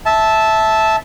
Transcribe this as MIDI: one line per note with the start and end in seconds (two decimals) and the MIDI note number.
0.06 0.96 76
0.06 0.96 81